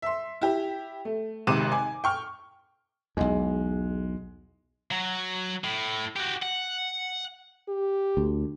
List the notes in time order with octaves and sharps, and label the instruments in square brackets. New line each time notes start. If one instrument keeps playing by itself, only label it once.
[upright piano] E5 C6
E4 G4
A3
G#1 G#2 C3 D6 D#7 E7
G#5
G5 C#6 F6
[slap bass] B1 E2 [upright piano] G#3
[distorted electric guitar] F#3
A2
F#4 G4
F#5
[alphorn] G4
[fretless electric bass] D2